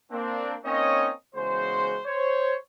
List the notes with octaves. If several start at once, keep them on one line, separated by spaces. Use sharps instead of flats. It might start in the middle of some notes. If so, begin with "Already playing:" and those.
A#3 C4 D4
A#3 C4 C#4 D#4 C#5 D#5
E2 C#3 G#3 F#4 C5
C5 C#5